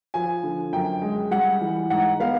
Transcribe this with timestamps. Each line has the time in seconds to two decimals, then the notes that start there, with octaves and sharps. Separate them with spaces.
0.14 F3 G#5
0.43 D3
0.73 F#2 G5
1.02 G#3
1.31 G3 F#5
1.61 E3
1.90 G#2 F#5
2.20 B3 F5